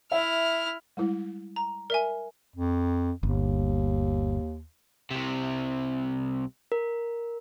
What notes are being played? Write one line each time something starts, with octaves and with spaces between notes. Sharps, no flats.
E4 E5 F6
G3 G#3 E4
A#5
A#4 D5 E5 G#5
F2
G1 D#2
C2 C3
A#4